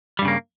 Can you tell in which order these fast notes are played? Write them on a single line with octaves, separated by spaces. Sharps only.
G3 G2 C#3 A#3